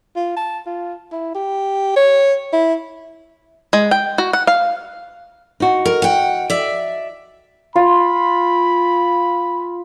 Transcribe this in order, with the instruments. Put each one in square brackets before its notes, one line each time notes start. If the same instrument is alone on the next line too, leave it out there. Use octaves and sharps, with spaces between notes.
[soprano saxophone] F4
A5
F4
E4
G4
C#5
E4
[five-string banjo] G#3
G5
F#4
F#5
F5
[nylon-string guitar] D#4 F#4
[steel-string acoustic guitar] A#4
F#5 G5
D5 E5
[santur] F4 [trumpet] B5